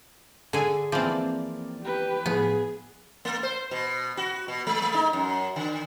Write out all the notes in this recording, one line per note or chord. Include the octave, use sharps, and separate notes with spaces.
D3 G#4 A4 G#5
E3 F3 A#3 C4 D5
G4 B4
A2 F3 B3 G#4
A3
C5
B2
F#4
B2
G#3
G#3
D#4
F#2
D3